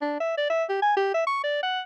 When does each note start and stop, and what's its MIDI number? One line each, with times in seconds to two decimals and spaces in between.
0.02 0.17 62
0.20 0.34 76
0.37 0.49 74
0.50 0.64 76
0.69 0.80 67
0.82 0.94 80
0.97 1.10 67
1.14 1.22 76
1.27 1.43 85
1.44 1.62 74
1.63 1.81 78